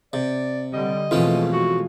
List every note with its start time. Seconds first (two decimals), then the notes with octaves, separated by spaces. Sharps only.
0.13 C3 D5
0.73 D3 G3 D#5
1.11 F2 B2 E3 G#3 A3 C#4 F4
1.53 F#4